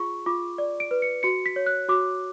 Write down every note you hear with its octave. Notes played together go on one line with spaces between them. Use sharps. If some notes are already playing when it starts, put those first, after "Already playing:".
Already playing: F4 G#4 C#6
F4 D6
D5
D7
B4
C#7
F#4 C#7
B6
C#5
F#6
F#4 D6